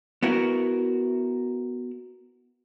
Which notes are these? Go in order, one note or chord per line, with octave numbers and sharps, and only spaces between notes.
B3 E4 F#4 A#4